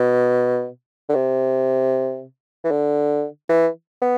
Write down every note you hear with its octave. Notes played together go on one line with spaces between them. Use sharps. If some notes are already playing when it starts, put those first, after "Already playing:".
Already playing: B2
D3
C3
E3
D3
E3
B3